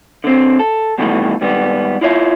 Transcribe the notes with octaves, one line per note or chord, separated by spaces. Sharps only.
D3 C4
A4
C#2 B2 D#3 E3 G3 A3
G#2 D#3 G3 B3
E4 F4 C#5 D5 E5